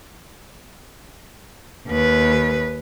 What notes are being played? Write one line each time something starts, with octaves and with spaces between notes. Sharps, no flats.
D#2 B4